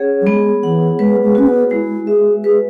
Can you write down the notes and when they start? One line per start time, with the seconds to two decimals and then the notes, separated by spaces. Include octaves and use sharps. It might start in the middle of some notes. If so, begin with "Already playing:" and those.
Already playing: C#4 G#4 C#5 F#5
0.21 F#3
0.27 G#3 B3
0.63 E3 F#5
0.99 G#3 B4
1.23 G#3
1.35 C#4 F#4
1.47 B3
1.71 G#3 E4
2.07 G#4 E5
2.44 G#4 B4